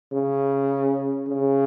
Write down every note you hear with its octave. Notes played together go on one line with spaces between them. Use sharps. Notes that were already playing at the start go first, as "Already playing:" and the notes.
C#3
C#3